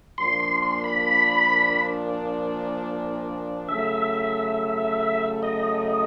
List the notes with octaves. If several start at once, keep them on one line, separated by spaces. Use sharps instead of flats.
A#2 F3 A#3 D4 C6
C6
C6
B5
C#3 F#3 A3 E5
D#5